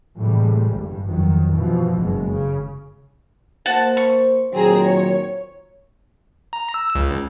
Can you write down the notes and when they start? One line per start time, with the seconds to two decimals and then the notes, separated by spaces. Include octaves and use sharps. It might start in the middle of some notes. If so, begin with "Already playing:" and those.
0.18 A2 C3 E3 G3 G#3
0.75 G1 G2
1.06 F2 D#3 F#3
1.54 G2 B2 E3 F3
1.97 F#1 B2 G#3
2.30 C#3
3.66 A#3 F#4 C5 A5
3.97 C#6
4.53 A#2 D#3 F#3 C4 G#4 A#5
4.84 C#5
6.53 A#5
6.74 E6
6.95 C#2